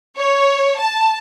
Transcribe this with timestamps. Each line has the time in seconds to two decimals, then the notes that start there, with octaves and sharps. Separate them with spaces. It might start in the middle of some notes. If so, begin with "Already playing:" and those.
0.17 C#5
0.78 A5